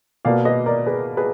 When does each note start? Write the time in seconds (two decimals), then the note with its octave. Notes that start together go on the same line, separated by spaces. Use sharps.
0.25 B2 A#3 D5 F5
0.45 B4 D#5
0.66 A#4 D5
0.86 G#4 B4
1.17 G#4 B4